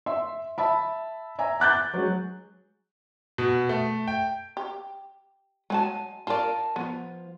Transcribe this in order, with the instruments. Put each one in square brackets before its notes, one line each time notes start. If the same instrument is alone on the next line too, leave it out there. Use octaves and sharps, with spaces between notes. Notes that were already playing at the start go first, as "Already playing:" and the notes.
[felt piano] E5 C6
E5 A5 B5
E5 G#5 A#5
D6 F#6 G6 A6
F#3 G#3
[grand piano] B2
A3
G5
[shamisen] G4
[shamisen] F#3 F#5 A5 [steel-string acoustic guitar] G#3 G#5
[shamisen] F4 D5 [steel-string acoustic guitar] A#4 G#5 A5
[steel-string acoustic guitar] F3 F4 [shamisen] B3